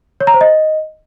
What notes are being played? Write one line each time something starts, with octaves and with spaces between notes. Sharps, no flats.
C#5
A#5
C5
D#5